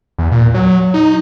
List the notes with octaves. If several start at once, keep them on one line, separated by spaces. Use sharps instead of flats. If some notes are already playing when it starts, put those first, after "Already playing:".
E2
A#2
F#3
D#4